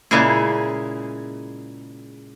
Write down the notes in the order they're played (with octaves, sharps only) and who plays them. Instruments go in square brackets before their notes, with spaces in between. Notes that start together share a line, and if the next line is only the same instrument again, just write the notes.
[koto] A#2 C#3 G#3 A#3 E4 G#4